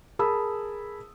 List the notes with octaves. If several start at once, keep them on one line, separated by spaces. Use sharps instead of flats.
G#4 A#4 A5 B5 D#6 E6